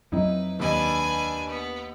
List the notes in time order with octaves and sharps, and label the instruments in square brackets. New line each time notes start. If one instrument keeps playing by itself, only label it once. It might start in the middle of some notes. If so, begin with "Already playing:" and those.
[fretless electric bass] F2 F#3 C4 [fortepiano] D#4 E4 [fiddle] B4
[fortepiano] D#2 D#5 [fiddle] D4 G#5 [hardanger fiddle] B4
[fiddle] B3